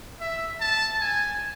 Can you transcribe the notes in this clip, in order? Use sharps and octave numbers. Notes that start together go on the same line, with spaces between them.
E5
A5
G#5